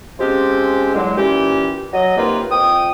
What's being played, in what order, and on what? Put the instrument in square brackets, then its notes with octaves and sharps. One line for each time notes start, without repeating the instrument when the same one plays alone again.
[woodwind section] F3 G#3 C4 C#4 G4
E2 D3 F#3 G#3
A#2 E3 C#4 G4
F#3 D#5
C3 D#3 A#3 D#4 F4 B4
F2 G5 D#6